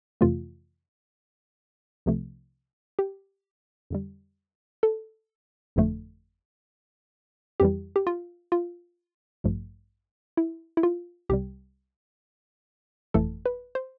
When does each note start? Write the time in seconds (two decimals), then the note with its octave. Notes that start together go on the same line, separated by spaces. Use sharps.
0.21 F2 C3 E3 A3 F4
2.06 C2 C3 F3 A3
2.99 G4
3.90 F2 D3 G3
4.83 A4
5.76 G1 F2 D3 F3 A3
7.60 F2 E3 G3 G4
7.96 G4
8.07 F4
8.52 F4
9.44 A1 G2 F3 A3
10.37 E4
10.77 E4
10.83 F4
11.29 C2 C3 G3 G4
13.14 G1 F2 E3 A3 A4
13.46 B4
13.75 C5